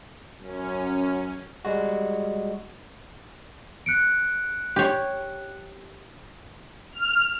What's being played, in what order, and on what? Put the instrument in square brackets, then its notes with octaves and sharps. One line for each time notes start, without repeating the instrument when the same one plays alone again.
[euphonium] F#2 [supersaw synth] C#4
[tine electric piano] G3 G#3 F#4
[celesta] F#6 C#7 D7
[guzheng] G4 C#5
[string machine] F6